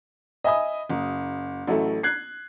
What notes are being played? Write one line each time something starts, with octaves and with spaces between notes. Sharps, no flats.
D#5 E5 G#5 B5 D#6
F#1
A1 F#3 A3 E4 A4
F#6 G#6 C7